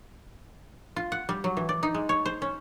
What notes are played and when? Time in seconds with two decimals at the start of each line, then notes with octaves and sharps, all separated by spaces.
0.96 F4
1.12 F#5
1.29 G3
1.44 F#3
1.57 E3
1.69 D5
1.83 D#4
1.94 G#3
2.09 C#5
2.26 C5
2.42 C#4